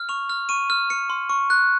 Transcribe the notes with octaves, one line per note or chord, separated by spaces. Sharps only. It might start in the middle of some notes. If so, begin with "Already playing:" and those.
Already playing: F6
C#6 F7
F6
C#6 D#7
F6
F6 C#7
C6
C#6
F#6